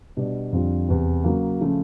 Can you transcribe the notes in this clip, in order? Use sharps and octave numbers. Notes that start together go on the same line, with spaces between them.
B2 G3 B3 D4
F2 D3 G3 C4 F4
E2 C3 E3
C#3 F#3 A#3
C#3 F3 A3